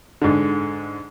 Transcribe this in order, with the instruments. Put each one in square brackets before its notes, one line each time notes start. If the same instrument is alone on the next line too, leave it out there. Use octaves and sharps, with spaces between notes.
[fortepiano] G#2 D3